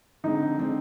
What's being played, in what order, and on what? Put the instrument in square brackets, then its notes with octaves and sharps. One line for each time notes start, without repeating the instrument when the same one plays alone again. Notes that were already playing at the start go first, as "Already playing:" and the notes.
[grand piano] D3 G#3 C4 [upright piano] D#4
[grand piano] D3 G#3 C4